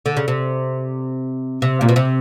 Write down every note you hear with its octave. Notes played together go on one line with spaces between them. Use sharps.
D3
C#3
C3
C3
A#2
B2
C3